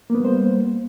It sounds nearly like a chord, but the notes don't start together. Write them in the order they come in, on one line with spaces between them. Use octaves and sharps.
A#3 B3 G3 C5